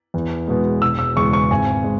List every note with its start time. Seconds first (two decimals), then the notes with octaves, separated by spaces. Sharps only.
0.14 E2
0.48 B2 G#3
0.82 E1 E6
0.99 E6
1.16 E2 C#3 G#3 C#6
1.33 C#6
1.50 G#1 G#5
1.84 G#3